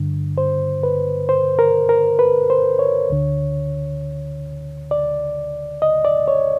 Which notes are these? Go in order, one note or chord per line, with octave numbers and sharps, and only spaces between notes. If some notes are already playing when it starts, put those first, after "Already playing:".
Already playing: G2 D3
C5
B4
C5
A#4
A#4
B4
C5
C#5
D2 D3
D5
D#5
D5
C#5